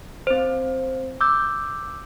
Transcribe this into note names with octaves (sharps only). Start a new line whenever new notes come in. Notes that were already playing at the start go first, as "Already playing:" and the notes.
C4 C5
D6 E6 G6